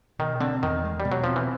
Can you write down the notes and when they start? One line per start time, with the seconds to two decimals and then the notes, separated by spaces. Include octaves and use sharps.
0.19 B2 D#3
0.40 D3 C4
0.63 E2 D#3
0.84 G#3
1.00 B2 G3
1.12 F#3
1.24 F3 C4
1.36 E3